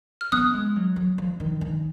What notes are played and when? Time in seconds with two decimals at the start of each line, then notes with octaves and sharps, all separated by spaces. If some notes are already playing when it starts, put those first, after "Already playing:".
0.21 F6
0.32 B3 D#6 F#6
0.53 G#3
0.76 F#3
0.96 F#3
1.18 F3
1.40 D#3
1.61 D#3